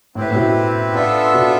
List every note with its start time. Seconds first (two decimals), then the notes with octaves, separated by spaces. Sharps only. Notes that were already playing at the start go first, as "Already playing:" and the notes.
0.15 A2 C4 E4 G4 B4
0.31 A2
0.35 B2
0.94 B3 D4 F4 A4 E5
1.33 B2